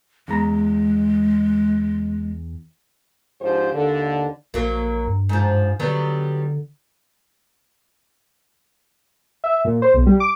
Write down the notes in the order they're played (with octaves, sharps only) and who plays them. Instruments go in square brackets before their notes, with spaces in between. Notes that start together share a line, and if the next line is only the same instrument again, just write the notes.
[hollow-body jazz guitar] E2 A#5 [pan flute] G#3
[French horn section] G#2 F3 D4 G4 C5
D#2 D3
[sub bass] A#1 [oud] F#3 A#3
[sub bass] G2
[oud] G#2 F3
[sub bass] D3 [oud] F#3 G3 B3
[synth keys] E5
A#2
C5
B1
G3
D6